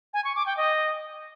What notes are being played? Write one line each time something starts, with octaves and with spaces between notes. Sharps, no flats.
G#5
C#6
D6
G5
D#5